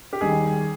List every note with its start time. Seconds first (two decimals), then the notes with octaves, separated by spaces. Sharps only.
0.13 G4
0.21 D#2 D#3 G3 G#4